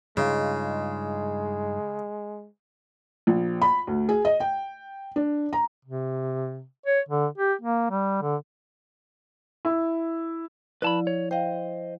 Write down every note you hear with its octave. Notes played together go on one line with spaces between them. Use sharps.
G2 C#3 G#3 D#4 F4
A#1
B5
D2
G#4
D#5
G5
D4
A#5
C3
C#5
D3
G4
A#3
G3
D3
E4
F3 E4 B4 D5 A5 B5
C#5
C5 D#5 F5 G5